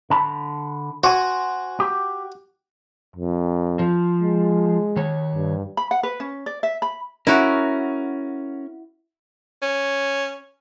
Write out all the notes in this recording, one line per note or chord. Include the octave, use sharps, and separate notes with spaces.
D3 A5 B5
F#4 C5 G#5
G4
F2
F3
G#3
D#3 C#5
G2
B5
F#5
B4
C#4
D5
E5
B5
C#4 E4 F#4 A#4
C#4